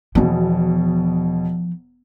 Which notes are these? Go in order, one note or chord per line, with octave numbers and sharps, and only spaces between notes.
E1 B2 E3 F3